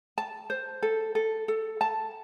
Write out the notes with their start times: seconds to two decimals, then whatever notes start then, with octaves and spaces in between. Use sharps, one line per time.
0.18 A5
0.50 C5
0.83 A4
1.15 A4
1.48 A4
1.81 A5